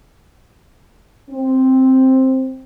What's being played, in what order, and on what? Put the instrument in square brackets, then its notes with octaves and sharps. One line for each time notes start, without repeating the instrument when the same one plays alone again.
[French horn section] C4